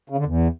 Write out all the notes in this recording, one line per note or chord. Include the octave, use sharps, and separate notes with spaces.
C#3
D3
E2